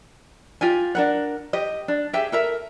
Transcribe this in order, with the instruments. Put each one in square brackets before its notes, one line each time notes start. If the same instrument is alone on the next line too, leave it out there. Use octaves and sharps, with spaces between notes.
[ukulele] F4 G4 G#5
D4 A#4 F#5
G4 D#5
D4
G4 G#4 E5 G5
A4 A#4 E5